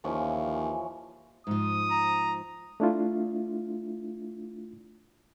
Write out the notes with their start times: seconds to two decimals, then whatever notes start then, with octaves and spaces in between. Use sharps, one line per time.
0.04 D#2 E3 F3 C#4
1.47 G#2 F3 D#6
1.91 A#5
2.80 A3 D4 E4 F4